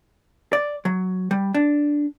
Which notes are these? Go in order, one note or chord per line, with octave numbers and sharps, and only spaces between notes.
D5
F#3
G3
D4